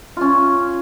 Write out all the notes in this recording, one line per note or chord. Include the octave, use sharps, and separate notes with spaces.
C#4 F4